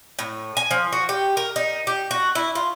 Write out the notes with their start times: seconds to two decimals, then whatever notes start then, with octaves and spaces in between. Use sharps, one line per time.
0.19 A2
0.57 G#5
0.71 F3
0.92 F#4
1.09 G4
1.37 A#4
1.56 D#4
1.87 G4
2.11 F#4
2.35 E4
2.55 F4